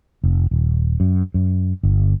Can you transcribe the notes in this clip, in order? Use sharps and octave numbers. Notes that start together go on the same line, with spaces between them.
F1
D#1
F#2
F#2
G1